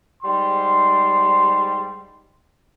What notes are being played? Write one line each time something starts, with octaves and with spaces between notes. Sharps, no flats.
G#2 G3 C6